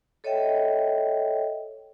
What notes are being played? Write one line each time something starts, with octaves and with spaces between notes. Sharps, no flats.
A4 C#5 D#5 E5 G5